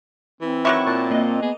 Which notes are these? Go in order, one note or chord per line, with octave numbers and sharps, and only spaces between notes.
E3 C4
D#3 F#3 E4 C#6 D6 F#6
A#2 A5
A#3 D#5
B3 G#4